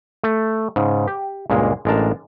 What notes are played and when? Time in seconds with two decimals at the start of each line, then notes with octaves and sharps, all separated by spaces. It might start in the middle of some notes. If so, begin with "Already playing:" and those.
0.24 A3
0.76 G#2 C#3
1.07 G4
1.50 C#2 G2 A#2 G#3 A#3
1.85 A1 G#3 D4 A#4 A5